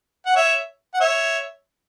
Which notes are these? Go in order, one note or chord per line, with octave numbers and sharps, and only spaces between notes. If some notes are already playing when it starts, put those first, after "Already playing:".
F#5
C#5 E5
F#5
C#5 E5